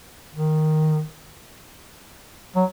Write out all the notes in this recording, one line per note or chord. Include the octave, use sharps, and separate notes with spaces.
D#3
F#3